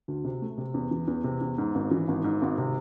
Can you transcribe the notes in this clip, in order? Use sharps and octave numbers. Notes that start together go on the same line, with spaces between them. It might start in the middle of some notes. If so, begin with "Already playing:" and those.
D2
C3
A3
C3
E2
E3
E2
C3
E2
G#2
G#1
E3
G#1
G#2
G#1
C3